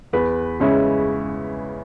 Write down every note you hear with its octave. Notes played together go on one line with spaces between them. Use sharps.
E2 B4
C#3 G#3 C#4 E4